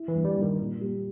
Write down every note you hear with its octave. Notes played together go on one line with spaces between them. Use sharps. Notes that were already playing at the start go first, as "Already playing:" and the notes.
Already playing: E4
E3
G2
G3
G2
D#3
A#2
G3